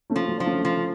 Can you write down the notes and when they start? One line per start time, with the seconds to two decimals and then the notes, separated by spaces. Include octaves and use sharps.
0.10 A3 C#4
0.16 F3
0.28 F#3 A3
0.38 F3 D4
0.46 A3 C#4
0.65 F3